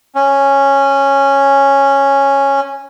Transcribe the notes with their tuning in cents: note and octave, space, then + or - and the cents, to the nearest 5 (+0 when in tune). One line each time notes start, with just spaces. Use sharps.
C#4 -5